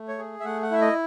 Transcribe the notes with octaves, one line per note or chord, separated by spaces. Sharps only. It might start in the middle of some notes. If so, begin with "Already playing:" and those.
Already playing: A3
C#5
G#4
E5
A3 F#5
F#5
E4 E5
D#5